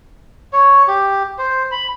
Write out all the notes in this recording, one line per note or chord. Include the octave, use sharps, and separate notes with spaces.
C#5
G4
C5
B5